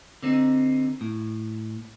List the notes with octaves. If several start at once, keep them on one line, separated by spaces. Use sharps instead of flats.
D3 C4 D#4
A2